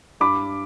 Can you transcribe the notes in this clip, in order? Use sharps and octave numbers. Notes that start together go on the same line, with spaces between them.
G2 B5 D6